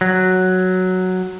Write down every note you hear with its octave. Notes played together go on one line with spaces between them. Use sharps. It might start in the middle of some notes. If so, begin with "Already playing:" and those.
F#3